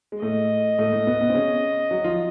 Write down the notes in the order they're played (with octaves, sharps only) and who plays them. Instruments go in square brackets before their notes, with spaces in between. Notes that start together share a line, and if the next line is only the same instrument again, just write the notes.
[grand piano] G#3
[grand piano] A2 A3 [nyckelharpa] D#5
[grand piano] A2 A3
A2 A3
B2 B3
B2 B3
C4
C#3 C#4
F#3 F#4
F3 F4